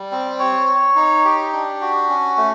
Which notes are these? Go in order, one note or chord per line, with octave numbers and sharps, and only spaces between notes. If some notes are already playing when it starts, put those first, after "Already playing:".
Already playing: G3
C4
C#5
C#5
D#4
G4
D4
F#4
C#4
A3